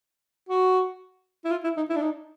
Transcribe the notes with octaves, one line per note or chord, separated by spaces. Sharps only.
F#4
E4
F4
E4
D#4
E4
D4
D#4